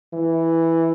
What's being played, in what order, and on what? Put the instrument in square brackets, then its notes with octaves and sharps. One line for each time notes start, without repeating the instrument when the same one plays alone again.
[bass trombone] E3